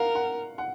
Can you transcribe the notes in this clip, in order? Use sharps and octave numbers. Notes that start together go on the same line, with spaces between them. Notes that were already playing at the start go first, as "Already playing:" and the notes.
Already playing: A#4 F5 F#5
F#5
F#5